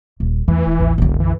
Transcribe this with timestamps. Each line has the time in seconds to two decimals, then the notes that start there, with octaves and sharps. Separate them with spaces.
0.20 D#1
0.48 E2 E3 A3
0.66 E1
0.80 A1 D#2
0.98 E1 B1 F#2 D3
1.20 E3